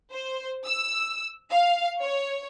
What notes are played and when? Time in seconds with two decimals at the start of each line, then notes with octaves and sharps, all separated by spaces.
0.12 C5
0.65 E6
1.51 F5
2.01 C#5